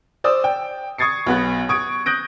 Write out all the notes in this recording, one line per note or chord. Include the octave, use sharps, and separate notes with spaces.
C5 D5 D#6 E6
G5
C#6 D#6 G#6 A6 C7 C#7
B1 B3 F#6
C#6 D#6 G#6 D7
D#6 F#6 G6 A#6 D7